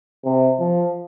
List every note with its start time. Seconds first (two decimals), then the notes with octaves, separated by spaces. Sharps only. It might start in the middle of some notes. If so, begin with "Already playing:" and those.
0.24 C3
0.59 F3